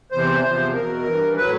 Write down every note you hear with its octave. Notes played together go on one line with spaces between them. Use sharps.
E2 C3 E3 C5
E2 C3 F3
E2 B2 F#3 A#4
G2 E3
A2 F#3 B4